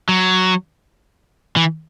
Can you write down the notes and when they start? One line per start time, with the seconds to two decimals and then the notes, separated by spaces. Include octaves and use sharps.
0.09 F#3
1.56 E3